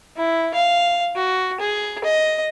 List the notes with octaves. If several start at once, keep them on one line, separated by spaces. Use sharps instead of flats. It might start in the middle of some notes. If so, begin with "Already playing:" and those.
E4
F5
F#4
G#4
D#5